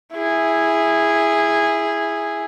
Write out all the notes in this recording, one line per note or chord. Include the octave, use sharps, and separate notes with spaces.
E4 G#4